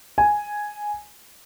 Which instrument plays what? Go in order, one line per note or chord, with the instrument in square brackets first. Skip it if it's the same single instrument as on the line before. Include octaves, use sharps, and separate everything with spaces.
[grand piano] G#5